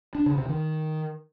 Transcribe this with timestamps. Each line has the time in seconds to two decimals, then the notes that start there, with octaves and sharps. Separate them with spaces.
0.15 D4
0.26 C#3
0.37 C3
0.49 D#3